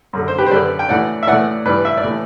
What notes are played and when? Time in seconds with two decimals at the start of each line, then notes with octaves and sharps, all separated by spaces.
0.13 F#2 D3
0.28 C5
0.38 G4 B4
0.46 C5
0.51 F#2 D3 B4 D5
0.79 G5
0.89 A2 E3 D5 F#5
1.23 E5
1.27 A2 E3 D5 F#5
1.65 G2 E3 B4 D5
1.85 E5
1.97 D5
2.03 A2 E3